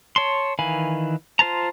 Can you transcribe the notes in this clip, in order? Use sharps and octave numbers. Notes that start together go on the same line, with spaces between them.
C#5 A5 C6
D#3 E3 F5 G#5 B5
F4 C5 A5 A#5